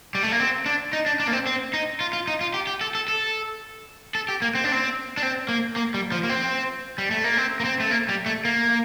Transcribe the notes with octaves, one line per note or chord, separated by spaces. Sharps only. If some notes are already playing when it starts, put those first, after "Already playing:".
G3
A3
A#3
C4
D4
D#4
D4
D4
A#3
C4
C4
D#4
F4
F4
D#4
F4
G4
G4
A4
A4
A4
A4
G4
A#3
C4
D4
C4
D4
C4
A#3
A#3
G3
F3
A#3
C4
G3
A3
A#3
C4
A#3
C4
A3
A#3
G3
A3
A#3